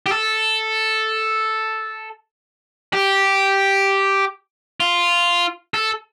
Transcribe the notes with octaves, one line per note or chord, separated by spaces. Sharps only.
G4
A4
G4
F4
A4